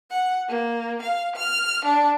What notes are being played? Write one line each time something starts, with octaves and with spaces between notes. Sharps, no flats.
F#5
A#3
F5
F6
D4